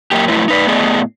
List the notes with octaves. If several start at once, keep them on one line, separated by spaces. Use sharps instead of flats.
F#2 A#3 G4
F2 F#3 A3 E4 B4
D#4 B4 D5
A2 A3 B3 G#4 D5 D#5